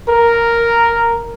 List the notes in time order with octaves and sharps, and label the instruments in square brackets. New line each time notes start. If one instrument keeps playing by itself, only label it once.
[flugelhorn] A#4